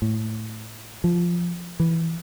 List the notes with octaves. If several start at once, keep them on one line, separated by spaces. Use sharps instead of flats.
A2
F3
E3